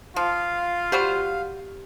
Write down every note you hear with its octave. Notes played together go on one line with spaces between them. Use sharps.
F3 F4 F5
G3 F#4 G4 C5